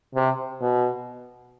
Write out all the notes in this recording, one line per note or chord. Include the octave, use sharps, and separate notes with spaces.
C3
B2